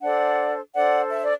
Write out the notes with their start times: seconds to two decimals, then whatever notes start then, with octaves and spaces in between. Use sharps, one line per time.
0.01 D4 A4 C5 D5 F#5
0.75 D4 A4 C5 D5 F#5
1.12 E5
1.23 D5